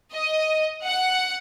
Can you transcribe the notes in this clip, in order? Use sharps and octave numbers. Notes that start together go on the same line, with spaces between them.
D#5
F#5